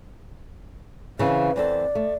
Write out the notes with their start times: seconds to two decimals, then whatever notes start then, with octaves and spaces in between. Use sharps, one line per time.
1.19 C#3 E3 C4 F5
1.56 E2 C4 A4 D5
1.95 A3